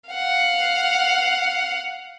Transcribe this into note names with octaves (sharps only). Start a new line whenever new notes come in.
F5 F#5